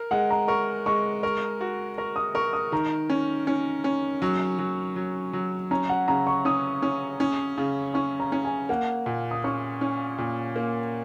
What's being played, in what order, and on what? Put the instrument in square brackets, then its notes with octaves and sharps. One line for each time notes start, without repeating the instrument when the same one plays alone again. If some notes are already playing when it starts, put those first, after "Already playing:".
Already playing: [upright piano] A#4
[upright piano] G#3 [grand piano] F#5
[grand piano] A#5
[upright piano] A#4 [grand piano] C#6
[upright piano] G#3 [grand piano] C#6
[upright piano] A#4 [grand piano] C#6
[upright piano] F#4
[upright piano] A#4 [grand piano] C#6
[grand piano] D#6
[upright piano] A#4 [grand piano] C#6
[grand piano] D#6
[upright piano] D#3 [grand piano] A#5
[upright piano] C#4
C#4
C#4
[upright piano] F#3 [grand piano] C#6
[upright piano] F#3
F#3
F#3
[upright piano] C#4 [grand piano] A#5
[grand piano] F#5
[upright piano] C#3 [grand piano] A#5
[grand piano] C#6
[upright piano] C#4 [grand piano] D#6
[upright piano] C#4
C#4
C#3
[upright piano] C#4 [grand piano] C#6
[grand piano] A#5
[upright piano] C#4
[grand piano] G#5
[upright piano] A#3 [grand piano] F#5
[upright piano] A#2
[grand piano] D#6
[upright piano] C#4 [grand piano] C#6
[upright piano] C#4
A#2
A#3